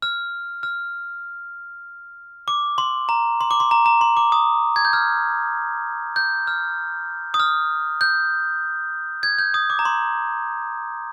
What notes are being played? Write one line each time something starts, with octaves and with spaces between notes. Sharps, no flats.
F6
F6
D6
C6
A#5
C6
D6
C6
A#5
A#5
C6
D6
D#6
G#6
G6
F6
G6
F6
D#6
F6
G6
G#6
G6
D#6
D6
A#5
C6